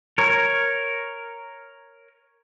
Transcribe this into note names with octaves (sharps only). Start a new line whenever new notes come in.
A#4 C#5